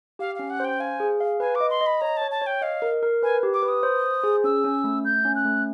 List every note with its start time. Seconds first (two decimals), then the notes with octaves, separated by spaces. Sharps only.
0.19 G4 F5
0.35 C#4 F5
0.50 F#5
0.60 C5 G5
0.80 F5 G#5
1.00 G#4
1.20 F5
1.40 B4 G#5
1.55 D6
1.61 D#5
1.70 C6
1.81 D#5
1.86 B5
2.01 C#5 A#5
2.17 C#5 A5
2.31 A5
2.42 C#5 G5
2.62 D#5 F5
2.82 A#4
3.03 A#4
3.23 B4 G#5
3.43 G4
3.53 D6
3.63 B4
3.68 D#6
3.83 C5
4.04 C5
4.24 G#4
4.44 C#4 E6
4.64 C#4
4.84 A3
5.04 A3 G6
5.25 C#4
5.35 F#6
5.45 A3